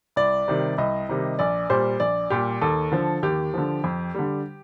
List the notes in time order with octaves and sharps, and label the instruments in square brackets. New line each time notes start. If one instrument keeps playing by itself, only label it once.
[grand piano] C2 D5
C3 D#3 G3
C2 D#5
C3 D#3 G3
A#1 D5
A#2 G3 C5
A#1 D5
A#2 G3 G4
D#2 A4
D3 F3
D#2 G4
D3 F3
F2
D3 G3